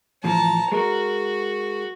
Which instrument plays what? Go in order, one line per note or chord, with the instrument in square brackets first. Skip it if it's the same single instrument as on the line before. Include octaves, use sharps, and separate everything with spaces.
[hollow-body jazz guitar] A2 E3 F3 [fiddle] A5 A#5
[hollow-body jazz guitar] G#3 A#4 [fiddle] F#4